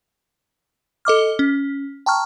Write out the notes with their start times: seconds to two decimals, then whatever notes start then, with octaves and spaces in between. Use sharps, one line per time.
1.05 A4 D#5 D6 F6
1.39 C#4
2.06 G5 A5 A#5 C#6 F6